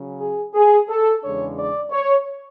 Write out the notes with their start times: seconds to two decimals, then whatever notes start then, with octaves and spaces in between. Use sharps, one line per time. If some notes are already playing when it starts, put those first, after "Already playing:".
Already playing: C#3 F#3 C#4
0.20 G#4
0.55 G#4
0.89 A4
1.23 E2 C#3 G#3 D4 C#5
1.58 D5
1.91 C#5